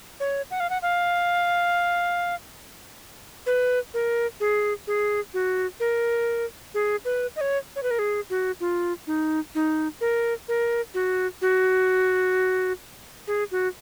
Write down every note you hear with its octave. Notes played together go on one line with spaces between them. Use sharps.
C#5
F#5
F5
F#5
F5
B4
A#4
G#4
G#4
F#4
A#4
G#4
B4
D#5
C#5
C#5
B4
A#4
G#4
F#4
F4
D#4
D#4
A#4
A#4
F#4
F#4
G#4
F#4